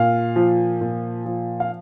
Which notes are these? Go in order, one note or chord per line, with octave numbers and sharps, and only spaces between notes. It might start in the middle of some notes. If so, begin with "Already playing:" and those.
Already playing: A#2 F5
F3
A#2
F3
F5